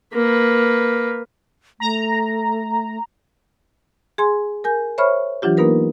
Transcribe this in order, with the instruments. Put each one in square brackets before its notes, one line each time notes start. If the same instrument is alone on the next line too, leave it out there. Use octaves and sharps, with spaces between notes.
[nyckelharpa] A#3 B4
[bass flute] A3 [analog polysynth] A#5
[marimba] G#4 G#5 C6
A#4 G#5 G6
C5 C#5 E5 B5 C#6 F6
E3 F#3 D4 F4 G4
A#3 B3 D#4 A#4 B4